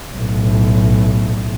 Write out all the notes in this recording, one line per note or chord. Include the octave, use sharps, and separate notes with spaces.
B1 A2